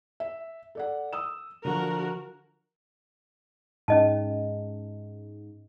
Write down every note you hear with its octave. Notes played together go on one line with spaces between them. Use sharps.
E5
A4 D5 F#5
D#6 E6 E7
D3 F3 F#4 A#4
G#2 C#4 D#5 A5